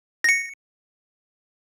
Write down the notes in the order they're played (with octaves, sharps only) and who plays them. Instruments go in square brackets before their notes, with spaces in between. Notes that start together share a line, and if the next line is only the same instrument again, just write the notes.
[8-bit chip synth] A#6 C#7